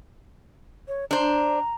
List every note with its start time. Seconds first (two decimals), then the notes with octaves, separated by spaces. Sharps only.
0.88 C#5
1.11 D4 C5 A#5